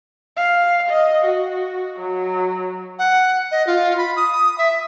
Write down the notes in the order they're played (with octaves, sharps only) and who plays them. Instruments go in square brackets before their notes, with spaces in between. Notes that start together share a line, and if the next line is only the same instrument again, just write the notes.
[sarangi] F5
D#5
F#4
F#3
[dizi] F#5
D#5
F4
B5
D#6
E5